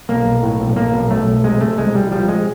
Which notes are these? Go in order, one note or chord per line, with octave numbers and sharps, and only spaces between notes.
B1 A#3
B1
A2
B1
B1 A#3
B1
B1 A3
B1
C3 G#3
C3 A3
C2 G#3
C2 G3
F3 G3
C3 G#3